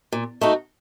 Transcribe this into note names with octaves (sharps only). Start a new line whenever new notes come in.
A#2
A3 D#4 F#4